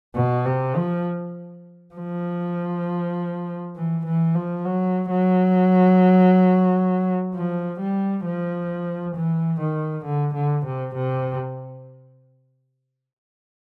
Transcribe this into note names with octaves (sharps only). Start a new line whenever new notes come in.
B2
C3
F3
F3
E3
E3
F3
F#3
F#3
F3
G3
F3
E3
D#3
D3
D3
C3
C3